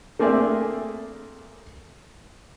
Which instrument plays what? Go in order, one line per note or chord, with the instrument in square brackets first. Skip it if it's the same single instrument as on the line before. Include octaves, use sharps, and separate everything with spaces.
[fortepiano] A3 A#3 C4 G#4 D5 E5